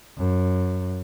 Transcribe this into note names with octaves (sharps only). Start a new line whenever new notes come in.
F#2